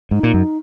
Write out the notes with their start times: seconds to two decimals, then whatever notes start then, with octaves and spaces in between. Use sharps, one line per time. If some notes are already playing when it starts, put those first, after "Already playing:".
0.11 G#2 D#4
0.23 A#2
0.34 F#2